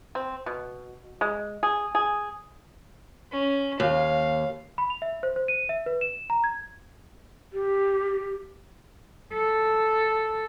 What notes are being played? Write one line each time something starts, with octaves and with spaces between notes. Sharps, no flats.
C4
B2
G#3
G#4
G#4
C#4
D#2 F5
B5
F7
E5
C5
C5
D#7
E5
B4
E7
A#5
G#6
G4
A4